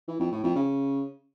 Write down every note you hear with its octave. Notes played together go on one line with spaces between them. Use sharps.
E3
F2
A2
F2
C#3